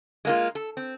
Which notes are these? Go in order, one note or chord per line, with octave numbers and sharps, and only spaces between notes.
G#3 A#3 F4
A4
C4